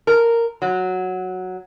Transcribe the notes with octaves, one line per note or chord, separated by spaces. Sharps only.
A#4
F#3